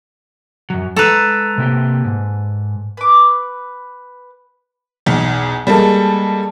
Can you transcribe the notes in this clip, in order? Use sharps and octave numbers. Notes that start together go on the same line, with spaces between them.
F#2 F#3
G#3 A4 B4 A#5
C3 A#3 G4
G#2
B4 D6
B1 E2
G3 G#3 A#3 A4